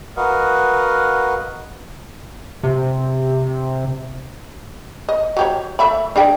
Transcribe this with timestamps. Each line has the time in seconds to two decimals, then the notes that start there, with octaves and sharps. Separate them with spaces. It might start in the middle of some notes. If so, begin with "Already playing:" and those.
0.16 F#4 A#4 B4 D#5 F5 F#5
2.63 C3
5.09 D#5
5.37 F#3 G4 C#5
5.79 A3 E5 B5
6.16 D4 G#4 G5